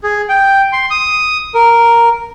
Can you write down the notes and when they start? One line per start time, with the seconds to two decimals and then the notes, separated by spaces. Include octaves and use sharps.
0.04 G#4
0.29 G5
0.73 C6
0.90 D#6
1.54 A#4